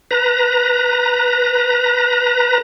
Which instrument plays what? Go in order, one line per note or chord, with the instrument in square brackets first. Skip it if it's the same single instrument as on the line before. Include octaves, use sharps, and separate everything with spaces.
[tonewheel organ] B4 A#5